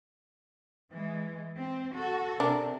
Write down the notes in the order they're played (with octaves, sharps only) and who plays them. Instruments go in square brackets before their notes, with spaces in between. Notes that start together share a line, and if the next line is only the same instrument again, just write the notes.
[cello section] E3 G#3
C4
F#4 A4
[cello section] C3 [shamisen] D4 A#4